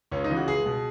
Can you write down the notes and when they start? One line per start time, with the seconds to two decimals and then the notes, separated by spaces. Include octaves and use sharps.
0.11 C#2 C#4
0.24 D#4
0.30 C#3 E3
0.36 F#4
0.48 C#2 G#4
0.66 B2